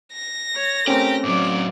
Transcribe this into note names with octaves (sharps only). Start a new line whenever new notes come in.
A#6
C#5
A3 C4 C#4 G4 A#4
A2 F#3 D5 D6